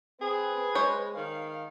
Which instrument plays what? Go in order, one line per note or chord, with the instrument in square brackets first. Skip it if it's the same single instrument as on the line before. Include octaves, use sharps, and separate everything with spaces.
[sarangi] C4 [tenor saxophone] G#4 [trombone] B4
[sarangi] G#3 [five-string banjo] C5 C#5
[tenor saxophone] D#3 [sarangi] F5